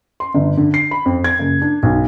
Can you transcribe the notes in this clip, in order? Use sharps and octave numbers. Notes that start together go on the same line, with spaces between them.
C6
G1
D3
C7
B5
F2
G#6
F#1
D4
B1